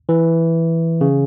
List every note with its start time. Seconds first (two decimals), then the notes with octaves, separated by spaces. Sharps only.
0.09 E3
1.01 C#3